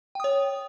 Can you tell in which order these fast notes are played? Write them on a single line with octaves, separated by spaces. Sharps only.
G5 D#6 C#5